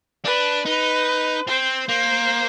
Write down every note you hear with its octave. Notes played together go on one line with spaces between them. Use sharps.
D4 B4
D#4 B4
C4 C5
A#3 C5